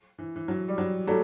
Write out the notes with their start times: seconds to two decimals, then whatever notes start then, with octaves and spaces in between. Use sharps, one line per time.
0.18 E3
0.36 E3
0.48 F#3
0.68 G3
0.78 F#3
1.07 F#3 G3 A3